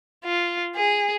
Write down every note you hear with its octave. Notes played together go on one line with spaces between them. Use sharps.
F4
G#4